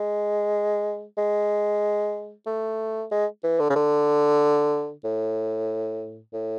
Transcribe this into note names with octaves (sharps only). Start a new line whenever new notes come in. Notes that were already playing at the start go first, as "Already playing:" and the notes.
Already playing: G#3
G#3
A3
G#3
E3
D3
C#3
D3
A2
A2